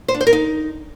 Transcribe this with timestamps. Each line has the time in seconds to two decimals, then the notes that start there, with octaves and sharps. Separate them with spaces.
0.08 C5
0.14 D4
0.21 C5
0.27 A#4
0.33 D#4